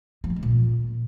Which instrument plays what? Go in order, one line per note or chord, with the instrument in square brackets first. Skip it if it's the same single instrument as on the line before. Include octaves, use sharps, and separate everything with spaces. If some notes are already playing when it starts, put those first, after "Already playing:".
[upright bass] F3
F#2
G#3
A#2